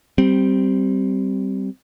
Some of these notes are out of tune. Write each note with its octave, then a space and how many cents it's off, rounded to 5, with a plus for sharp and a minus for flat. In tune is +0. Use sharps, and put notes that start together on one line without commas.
G3 -15 C4 -5